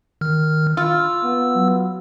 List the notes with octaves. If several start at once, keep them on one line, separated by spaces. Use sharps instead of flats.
D#3 F6
F4 E6
B3
F#3